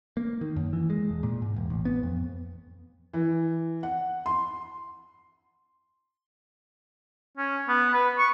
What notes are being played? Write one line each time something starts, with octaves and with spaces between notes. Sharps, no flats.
A#3
D#3
F#2
E3
G#3
E1
A#2
G#2
E1
A1
B3
F2
E3
F#5
C6
C#4
B3
B4
C#6